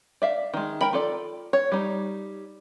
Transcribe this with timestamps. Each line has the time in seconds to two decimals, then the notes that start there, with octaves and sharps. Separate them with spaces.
0.22 D5 E5 F5
0.54 D#3 G#3
0.81 A#4 G5 A#5 B5
0.93 F4 A4 D5
1.53 C#5
1.72 G3 D#4